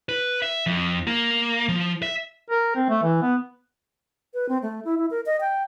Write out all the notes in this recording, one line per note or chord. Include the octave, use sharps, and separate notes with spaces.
B4
E5
F2
A#3
F3
E5
A#4
C4
A3
E3
B3
B4
C4
A3
E4
E4
A#4
D#5
G5